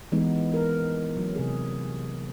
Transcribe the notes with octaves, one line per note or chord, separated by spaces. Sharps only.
E3 G#3 B3 D#4
A#4
F#3
C3 F#3 G#4